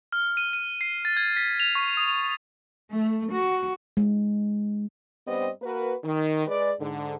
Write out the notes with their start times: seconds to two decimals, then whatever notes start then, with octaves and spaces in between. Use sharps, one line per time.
0.12 F6
0.37 D#7
0.53 D#7
0.81 C7
1.05 A6
1.17 G#6
1.37 B6
1.60 F7
1.75 C#6
1.97 D#6
2.91 A3
3.33 F#4
3.97 G#3
5.27 G2 G3 B3 C4 C5 D#5
5.62 A#3 F#4 A#4 B4
6.04 D#3
6.47 G#3 G#4 B4 D5
6.80 G#2 D3